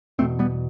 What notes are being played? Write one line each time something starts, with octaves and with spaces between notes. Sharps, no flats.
E2 B2 A3 C4
G3 B3